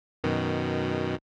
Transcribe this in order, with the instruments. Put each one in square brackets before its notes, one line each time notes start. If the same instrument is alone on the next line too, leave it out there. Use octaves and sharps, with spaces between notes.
[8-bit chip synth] F#2 B2 D#3